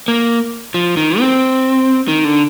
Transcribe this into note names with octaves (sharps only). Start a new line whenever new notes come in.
A#3
F3
D#3
C4
D#3
D3